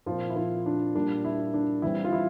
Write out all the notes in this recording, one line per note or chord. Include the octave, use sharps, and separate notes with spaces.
A#2 F3 C4 F4
E4
F3 F4
D4
A#2 G3 A#3 D4
E4
D4
E3 G3 C4 E4
F4
E4